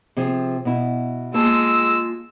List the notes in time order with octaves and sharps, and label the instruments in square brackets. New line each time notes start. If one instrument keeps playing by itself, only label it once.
[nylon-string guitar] C3 F3 G#4
B2 E4
[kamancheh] G#3 E6 [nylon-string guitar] A#3 F4 A5